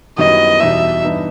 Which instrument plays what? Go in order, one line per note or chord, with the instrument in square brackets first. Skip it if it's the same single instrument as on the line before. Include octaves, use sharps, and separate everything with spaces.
[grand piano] F#2 D#3 G3 B3 E4 [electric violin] D#5
[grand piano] E2 B2 G3 D#4 G4 [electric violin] E5
[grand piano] G2 E3 B3 D#4